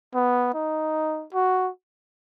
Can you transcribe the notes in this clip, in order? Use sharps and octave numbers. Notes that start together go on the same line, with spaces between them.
B3
D#4
F#4